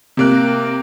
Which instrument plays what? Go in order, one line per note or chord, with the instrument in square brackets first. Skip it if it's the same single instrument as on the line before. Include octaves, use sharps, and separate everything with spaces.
[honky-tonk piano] C3 A#3 F#6